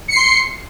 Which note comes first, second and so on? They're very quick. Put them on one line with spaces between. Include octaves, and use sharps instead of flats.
C#7 C7 C6